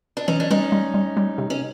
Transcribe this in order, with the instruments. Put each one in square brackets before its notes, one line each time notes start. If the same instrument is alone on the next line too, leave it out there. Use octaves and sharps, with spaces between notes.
[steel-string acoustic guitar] D4
[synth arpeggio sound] E3 [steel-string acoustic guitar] C#4 D#4
[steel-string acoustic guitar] D4
[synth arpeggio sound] G3 [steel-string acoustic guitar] C#4 D#4
[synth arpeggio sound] G3
G3
G3
C3
[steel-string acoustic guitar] C#4